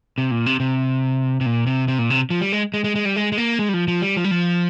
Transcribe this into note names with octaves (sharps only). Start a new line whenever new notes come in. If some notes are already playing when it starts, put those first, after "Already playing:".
C3
A#2
C3
C3
C3
A#2
C3
C3
A#2
C3
F3
G3
G#3
G#3
G#3
G#3
G3
G#3
G#3
A#3
G#3
G3
F3
F3
G3
F3
G3
F3